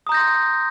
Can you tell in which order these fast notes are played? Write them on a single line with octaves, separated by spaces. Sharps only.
D#6 A#5 G6 A#6 C6